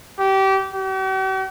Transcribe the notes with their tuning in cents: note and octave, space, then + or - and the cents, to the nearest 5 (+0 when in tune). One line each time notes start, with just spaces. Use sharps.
G4 -25
G4 -45